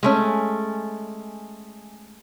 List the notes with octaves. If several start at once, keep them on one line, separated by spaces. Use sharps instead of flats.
G#3 A3 C#4